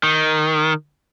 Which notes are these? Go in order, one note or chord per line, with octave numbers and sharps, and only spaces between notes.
D#3